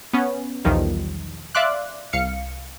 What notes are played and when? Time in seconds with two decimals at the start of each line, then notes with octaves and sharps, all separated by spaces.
0.13 B3 C#4
0.65 B1 E2 D#3 F3 G3
1.55 D5 E5 F5 C6 D6 F#6
2.13 C2 F5 C#7